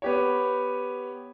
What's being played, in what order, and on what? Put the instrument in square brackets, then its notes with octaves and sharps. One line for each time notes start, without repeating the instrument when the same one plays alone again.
[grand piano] B3 G4 C#5